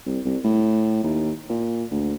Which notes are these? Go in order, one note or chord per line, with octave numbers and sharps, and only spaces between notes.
C2
C2
A2
D#2
A#2
D2